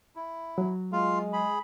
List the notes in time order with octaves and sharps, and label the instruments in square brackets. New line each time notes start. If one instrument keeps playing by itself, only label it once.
[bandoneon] E4
[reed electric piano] F#3
[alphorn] G#3 [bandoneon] F4 F5
[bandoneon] G#4 B5